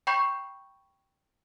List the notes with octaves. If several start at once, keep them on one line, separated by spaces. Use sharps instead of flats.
G5 B5 C#6 G6 C7